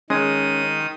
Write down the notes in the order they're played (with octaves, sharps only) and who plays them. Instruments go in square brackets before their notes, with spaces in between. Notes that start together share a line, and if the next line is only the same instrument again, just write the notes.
[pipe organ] D#3 D#6 [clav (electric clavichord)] G#3 [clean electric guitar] C#4